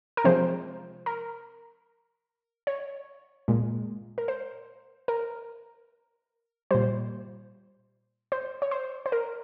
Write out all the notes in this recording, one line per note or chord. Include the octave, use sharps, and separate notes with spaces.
A#4
C3 F3 G#3 C5
A#4
C#5
A#2 G#3
A#4
C5
A#4
A#2 G3 C5
C5
C#5
C5
C5
A#4